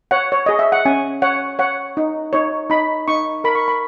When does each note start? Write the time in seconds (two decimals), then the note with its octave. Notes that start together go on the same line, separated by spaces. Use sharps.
0.11 C#5 F#5
0.32 C#5
0.46 G#4 D#5
0.59 E5
0.72 F#5
0.85 C#4 G#5
1.22 C#5 F#5
1.59 C#5 F#5
1.97 D#4
2.33 D#4 C#5
2.70 D#4 B5
3.08 D#4 C#6
3.44 A#4 B5
3.55 C#6
3.68 B5